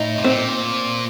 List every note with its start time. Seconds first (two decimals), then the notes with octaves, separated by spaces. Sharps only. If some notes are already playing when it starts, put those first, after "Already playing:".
Already playing: A2 D#4
0.17 C3
0.24 A#2 C4